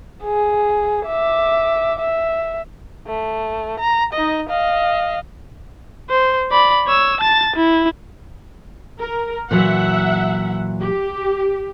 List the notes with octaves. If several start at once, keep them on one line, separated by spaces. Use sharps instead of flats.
G#4
E5 D6
E5
A3
A#5
D#4 D#5
D#5 F5
C5
D5 B5
C#5 E6
A5 A6
E4
A#4
A#2 E3 F#3 E5 F#5
G4